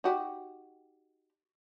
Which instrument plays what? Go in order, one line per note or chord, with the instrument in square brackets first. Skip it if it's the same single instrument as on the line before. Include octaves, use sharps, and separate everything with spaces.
[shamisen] D#4 F#4 G4